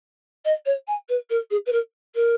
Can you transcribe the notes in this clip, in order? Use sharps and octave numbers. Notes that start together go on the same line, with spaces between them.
D#5
C#5
G#5
B4
A#4
G#4
B4
A#4
A#4